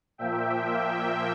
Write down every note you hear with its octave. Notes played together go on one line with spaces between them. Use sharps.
A#2 F3 A#3 E5 G5